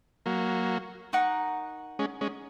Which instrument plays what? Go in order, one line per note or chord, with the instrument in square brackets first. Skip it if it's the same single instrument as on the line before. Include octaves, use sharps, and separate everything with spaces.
[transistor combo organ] F#3 A#3
[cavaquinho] D#4 A#4 F#5 C#6
[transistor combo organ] G#3 C#4
G#3 C#4